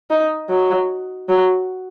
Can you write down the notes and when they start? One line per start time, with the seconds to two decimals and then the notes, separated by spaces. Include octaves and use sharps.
0.10 D#4
0.50 F#3
1.29 F#3